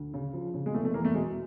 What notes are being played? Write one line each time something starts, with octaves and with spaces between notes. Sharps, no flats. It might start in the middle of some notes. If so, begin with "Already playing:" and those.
Already playing: D2
C#3
F3
C#3
G#3
F1 A3
A3
E2 A#3
A3
B2 G#3